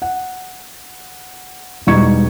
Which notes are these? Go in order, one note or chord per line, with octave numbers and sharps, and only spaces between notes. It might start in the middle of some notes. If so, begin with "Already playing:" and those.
F#5
E1 G3 D#4 C#6 G#6 C#7